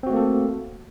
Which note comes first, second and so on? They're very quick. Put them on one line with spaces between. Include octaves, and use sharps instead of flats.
C4 F#4 A3 A#3 A4